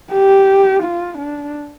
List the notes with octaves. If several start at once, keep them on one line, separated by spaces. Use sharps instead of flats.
G4
F4
D4